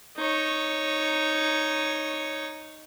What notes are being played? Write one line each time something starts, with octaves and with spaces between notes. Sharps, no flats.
D#4 C#5